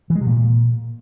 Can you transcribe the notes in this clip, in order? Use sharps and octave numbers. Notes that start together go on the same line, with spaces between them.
E3
G#3
C3
A#2